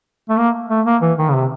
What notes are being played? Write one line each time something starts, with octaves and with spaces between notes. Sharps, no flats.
A3
A#3
A3
A#3
E3
D#3
C#3
C3